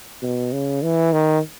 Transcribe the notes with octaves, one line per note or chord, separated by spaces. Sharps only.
B2
C#3
E3
D#3